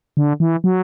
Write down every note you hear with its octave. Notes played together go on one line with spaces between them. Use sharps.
D3
E3
F#3